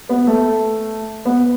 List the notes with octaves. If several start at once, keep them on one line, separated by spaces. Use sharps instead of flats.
B3
A3
B3